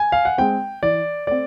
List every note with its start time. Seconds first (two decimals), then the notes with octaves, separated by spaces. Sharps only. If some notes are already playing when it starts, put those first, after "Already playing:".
Already playing: G#5
0.12 F5
0.25 F#5
0.38 G#3 C4 G5
0.83 E3 D5
1.27 A3 C4 D5